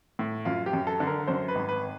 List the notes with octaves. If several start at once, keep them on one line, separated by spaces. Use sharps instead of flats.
A2
F#2 F4
G4
F#2
A4
D3
A#4
F#2 C5
B4
G#1
B4